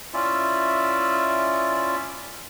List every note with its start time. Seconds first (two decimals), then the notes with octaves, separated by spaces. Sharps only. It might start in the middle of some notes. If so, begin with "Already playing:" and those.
0.14 C#4 E4 F4 D5 E5